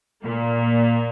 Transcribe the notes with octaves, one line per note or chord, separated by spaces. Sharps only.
A#2 A#3